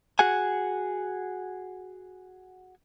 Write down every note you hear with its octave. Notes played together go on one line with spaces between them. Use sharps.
F#4 G#4 F#5 G#5